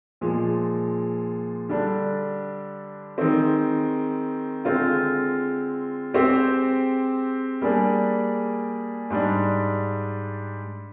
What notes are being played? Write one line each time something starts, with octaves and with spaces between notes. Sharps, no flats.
A#2 F3 G#3
D3 G3 D4
D#3 G#3 C4
D3 G#3 C4 F4
G#3 C4 G4 C5
G3 A#3 D4 G#4 D5
G#2 G3 D4